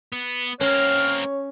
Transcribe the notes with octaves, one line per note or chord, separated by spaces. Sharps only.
B3
A#3 C4 C#4 C#5 F6